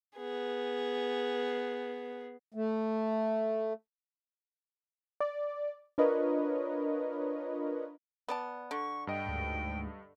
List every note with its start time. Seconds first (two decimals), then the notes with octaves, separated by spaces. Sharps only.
0.17 B3 G#4
2.54 A3
5.20 D5
5.98 D4 F4 A#4 B4 C#5 D#5
8.28 B3 D5 A5
8.71 D3 C#6
9.07 G2 D#5 G5
9.26 D2 G#2